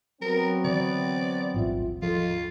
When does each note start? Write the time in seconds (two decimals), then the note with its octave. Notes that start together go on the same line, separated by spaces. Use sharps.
0.22 F#3 B3 C4 A#4
0.64 D3 E3 D5
1.54 D#1 A1 G#2 F4 E5
2.02 F3 F4 A4